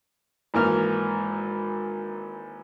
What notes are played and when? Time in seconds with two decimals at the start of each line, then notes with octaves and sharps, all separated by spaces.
0.54 G#1 E3 A#3 F6